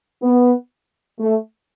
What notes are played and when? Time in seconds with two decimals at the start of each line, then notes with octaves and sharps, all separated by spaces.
0.23 B3
1.20 A3